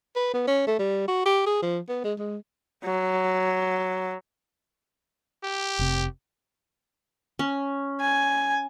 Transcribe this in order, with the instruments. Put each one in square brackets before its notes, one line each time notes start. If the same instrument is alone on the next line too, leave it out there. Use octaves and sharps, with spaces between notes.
[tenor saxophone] B4
B3
C#4
A3
G3
F#4
G4
G#4
F3
B3
G#3
G#3
[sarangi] F#3
[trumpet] G4
[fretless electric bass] F1 C3
[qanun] C#4
[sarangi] G#5